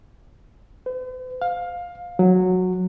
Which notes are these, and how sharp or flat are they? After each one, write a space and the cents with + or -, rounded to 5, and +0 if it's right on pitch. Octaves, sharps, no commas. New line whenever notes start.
C5 -45
F5 +15
F#3 -10